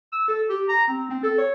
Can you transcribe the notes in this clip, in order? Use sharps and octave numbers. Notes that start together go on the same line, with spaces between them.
E6
A4
G4
A#5
C4
C4
A4
C#5